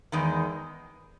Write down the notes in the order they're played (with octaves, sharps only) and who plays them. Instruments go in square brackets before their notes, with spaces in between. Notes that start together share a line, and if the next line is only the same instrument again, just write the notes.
[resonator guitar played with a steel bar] E2 D#3 G#3